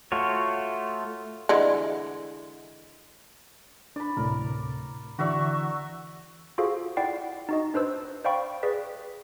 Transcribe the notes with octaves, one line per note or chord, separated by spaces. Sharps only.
A3 F4 F#4 C#5
D3 E3 G#3
D4 D5 B5
D2 A2 C3 A#4
D3 E3 F#4 D5 E5 C#6
F4 F#4 G#4 A4 C5 F5
E4 D5 F#5 G5 C7
D#4 F#4 D#5
D4 B4 C5 E6
C5 D5 F5 G5 B5 C#6
G#4 B4 D5 B6